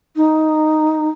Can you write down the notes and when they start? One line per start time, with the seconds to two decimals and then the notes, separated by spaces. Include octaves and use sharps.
0.16 D#4